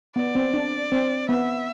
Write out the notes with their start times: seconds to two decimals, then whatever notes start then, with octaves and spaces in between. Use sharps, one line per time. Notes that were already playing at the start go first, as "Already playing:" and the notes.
0.15 B3 D5
0.35 C4
0.54 D4
0.92 C4
1.29 B3 E5